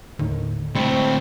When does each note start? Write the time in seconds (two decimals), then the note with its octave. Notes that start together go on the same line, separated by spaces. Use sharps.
0.19 D#2 A2 D3 D#3
0.75 D2 A2 G#3 C4 B5 C#6